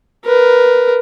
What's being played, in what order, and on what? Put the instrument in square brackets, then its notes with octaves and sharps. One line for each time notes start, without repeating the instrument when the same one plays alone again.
[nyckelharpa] A#4 B4